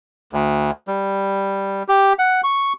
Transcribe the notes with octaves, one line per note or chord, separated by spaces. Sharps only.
D2
G3
G4
F#5
C#6